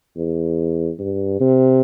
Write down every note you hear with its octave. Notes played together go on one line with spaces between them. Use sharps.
E2
G2
C3